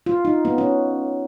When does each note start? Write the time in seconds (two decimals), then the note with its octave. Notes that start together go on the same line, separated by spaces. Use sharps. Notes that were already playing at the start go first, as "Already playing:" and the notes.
0.06 F4
0.25 D#4
0.45 B3
0.58 C#4